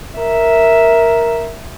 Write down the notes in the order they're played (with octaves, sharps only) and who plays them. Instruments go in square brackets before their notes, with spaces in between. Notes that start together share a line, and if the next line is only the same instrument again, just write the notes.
[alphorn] A#4 [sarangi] E5